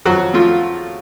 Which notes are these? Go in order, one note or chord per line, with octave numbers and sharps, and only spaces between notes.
F2 F#3 F#4
F3 A3 F4